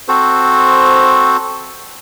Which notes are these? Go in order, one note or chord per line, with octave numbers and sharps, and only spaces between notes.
C4 F#4 A4 C5